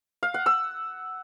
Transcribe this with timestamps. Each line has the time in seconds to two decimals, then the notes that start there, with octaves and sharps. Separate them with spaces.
0.23 F5
0.34 F#5
0.46 E6